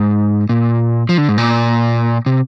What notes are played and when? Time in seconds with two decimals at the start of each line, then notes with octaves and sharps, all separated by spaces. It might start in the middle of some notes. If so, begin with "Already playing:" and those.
Already playing: G#2
0.49 A#2
1.09 F3
1.18 D3
1.28 G#2
1.38 A#2
2.26 C3